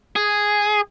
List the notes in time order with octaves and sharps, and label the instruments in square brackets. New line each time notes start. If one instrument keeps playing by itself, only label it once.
[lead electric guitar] G#4